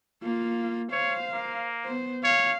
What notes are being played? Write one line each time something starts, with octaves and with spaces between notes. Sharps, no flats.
A#3 F4
C5 C#5 F5
A#3
B3 C5
C#5 F5